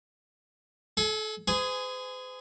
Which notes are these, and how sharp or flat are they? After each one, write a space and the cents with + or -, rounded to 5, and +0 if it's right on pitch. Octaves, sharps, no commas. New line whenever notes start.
A4 -30 G#5 +20
G#4 +0 C5 -45 G#5 +5